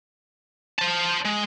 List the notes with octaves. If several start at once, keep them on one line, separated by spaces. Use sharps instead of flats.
C5 A5
G#3